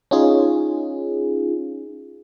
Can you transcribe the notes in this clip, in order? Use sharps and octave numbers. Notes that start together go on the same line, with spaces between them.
C#4 D#4 F4 G#4